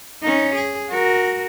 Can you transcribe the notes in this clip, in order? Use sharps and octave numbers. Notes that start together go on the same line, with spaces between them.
C#4 D#4
G#4
F#4 A#4